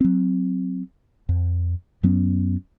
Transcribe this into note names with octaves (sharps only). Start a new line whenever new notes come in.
F#3 C4
F2
F#2 F#3 B3 C#4